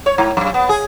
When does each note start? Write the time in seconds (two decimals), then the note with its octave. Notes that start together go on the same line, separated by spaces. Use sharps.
0.06 C#5
0.18 G#2
0.37 F#2
0.54 B3
0.69 G#4